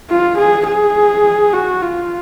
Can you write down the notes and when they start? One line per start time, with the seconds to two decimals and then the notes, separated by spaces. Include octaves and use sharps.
0.10 F4
0.38 G#4
0.67 G#4
1.53 F#4
1.82 F4